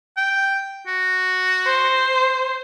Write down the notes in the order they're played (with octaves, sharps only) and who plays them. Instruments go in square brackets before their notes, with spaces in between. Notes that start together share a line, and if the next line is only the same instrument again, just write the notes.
[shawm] G5
F#4
[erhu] C5